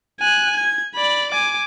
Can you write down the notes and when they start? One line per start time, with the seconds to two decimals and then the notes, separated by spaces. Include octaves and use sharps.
0.20 G#5 F#6
0.57 G#6
0.95 D5 B5
1.32 G#5 D6